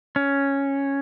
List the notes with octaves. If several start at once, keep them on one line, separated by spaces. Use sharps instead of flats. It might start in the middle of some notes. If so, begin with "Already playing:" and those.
C#4